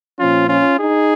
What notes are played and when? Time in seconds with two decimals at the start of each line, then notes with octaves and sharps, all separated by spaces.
0.19 A#2 F3 C#4 F4
0.49 C#4 F4
0.80 D#4 G#4